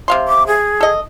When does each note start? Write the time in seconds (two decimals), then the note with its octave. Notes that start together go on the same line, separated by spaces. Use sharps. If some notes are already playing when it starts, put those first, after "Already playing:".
0.08 C3 F5 C6
0.28 D6
0.47 G#4
0.81 A4 D#5